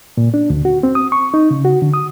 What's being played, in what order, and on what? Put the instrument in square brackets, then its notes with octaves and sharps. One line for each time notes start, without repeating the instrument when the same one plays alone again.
[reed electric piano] A#2
D4
D2
F#4
C4
D#6
C#6
D#4
C#3
F#4
D3
D#6